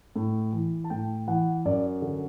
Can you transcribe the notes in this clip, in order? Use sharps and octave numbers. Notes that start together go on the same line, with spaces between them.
A2
E3
A5
A2 G5
E3 F#5
F#2 D5
D3